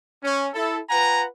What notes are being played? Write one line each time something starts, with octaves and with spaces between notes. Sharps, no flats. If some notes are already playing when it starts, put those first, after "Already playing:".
C#4
E4 A4
F4 B4 F#5 G#5 A#5